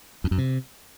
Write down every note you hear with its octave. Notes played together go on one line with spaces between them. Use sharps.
F2
F#2
C3